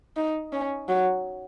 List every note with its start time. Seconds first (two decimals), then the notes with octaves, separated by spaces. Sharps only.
0.16 D#4
0.53 C#4
0.89 F#3